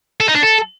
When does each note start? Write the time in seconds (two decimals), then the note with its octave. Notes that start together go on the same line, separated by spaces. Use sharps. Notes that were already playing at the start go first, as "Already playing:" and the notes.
0.20 A4
0.28 D#4
0.35 D4
0.43 A4